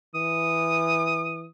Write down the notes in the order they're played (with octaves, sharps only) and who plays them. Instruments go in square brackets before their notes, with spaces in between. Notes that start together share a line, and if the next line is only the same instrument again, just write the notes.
[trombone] E3 [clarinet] D#6